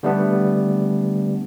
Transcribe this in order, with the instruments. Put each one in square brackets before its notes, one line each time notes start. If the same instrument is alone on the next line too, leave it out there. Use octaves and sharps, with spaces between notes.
[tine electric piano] D3 G3 A3 B3 D4